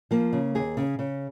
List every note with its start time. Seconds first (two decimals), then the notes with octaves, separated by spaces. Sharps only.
0.11 F3 A#3
0.33 C#3
0.55 D#2 G#4
0.77 C#3
0.99 C#3